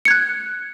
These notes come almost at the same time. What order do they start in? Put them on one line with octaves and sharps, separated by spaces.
C#7 G#6 F#6